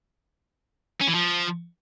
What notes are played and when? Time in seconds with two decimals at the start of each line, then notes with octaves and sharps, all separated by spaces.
1.01 C#4
1.08 E3
1.15 F3